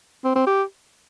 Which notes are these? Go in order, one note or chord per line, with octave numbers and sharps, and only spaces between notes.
C4
C4
G4